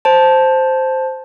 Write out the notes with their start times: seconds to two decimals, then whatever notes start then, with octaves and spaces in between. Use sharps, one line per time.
0.05 C5 A5